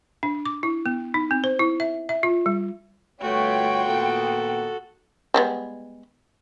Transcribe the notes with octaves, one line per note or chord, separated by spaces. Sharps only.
D4
D6
E4
B3
D#4
C4
C5
E4
E5
E5
F4
G3
G1 A3 F4 F#4 B4 C#5 G5
A#2 D#3 B3 A4
G3 G#3 B3